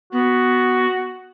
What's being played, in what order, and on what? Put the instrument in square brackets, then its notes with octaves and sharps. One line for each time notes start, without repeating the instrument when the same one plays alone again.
[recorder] B3 [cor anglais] F#4